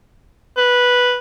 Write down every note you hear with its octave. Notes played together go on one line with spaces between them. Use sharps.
B4